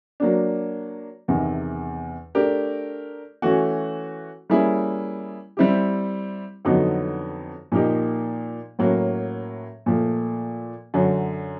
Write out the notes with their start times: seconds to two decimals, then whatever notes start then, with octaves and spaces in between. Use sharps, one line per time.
0.20 F#3 A#3 D4
1.28 E2 C3 D#3
2.35 A3 D4 G4 A#4
3.42 E3 A3 C#4 F#4
4.50 G3 A#3 C#4 E4 G#4
5.57 G3 C4 E4 G4
6.65 F2 D3 F#3 B3 D#4
7.72 A#2 F3 A#3 D#4 G4
8.79 A2 F#3 A#3 C#4 F#4
9.86 A#2 F3 A3
10.94 F#2 D3 F#3